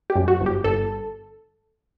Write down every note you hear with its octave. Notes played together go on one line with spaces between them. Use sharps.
G4
F#2
F#4
G1
G4
G1 A4